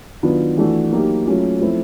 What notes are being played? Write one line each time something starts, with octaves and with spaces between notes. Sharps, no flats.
D#3 F#3 B3 D4 F4
E3 A3 D4 F#4
F#3 A#3 D#4 G4
F#3 A3 C#4 F4
F3 A3 C4 E4